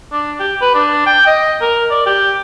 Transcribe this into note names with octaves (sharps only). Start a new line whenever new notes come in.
D4
G4
B4
D4
G5
D#5
A#4
D5
G4